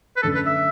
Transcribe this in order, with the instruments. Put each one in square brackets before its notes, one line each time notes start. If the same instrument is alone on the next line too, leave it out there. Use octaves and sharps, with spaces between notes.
[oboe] B4
[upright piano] F#2 D3 A3 [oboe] A4
[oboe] B4
E5